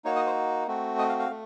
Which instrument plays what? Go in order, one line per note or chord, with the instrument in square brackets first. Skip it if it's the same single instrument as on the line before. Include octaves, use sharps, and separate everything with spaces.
[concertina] A#3 D#4 F#4 C#5
D#5
C5
A3 C4 F#4
D#5
F5
F5
A3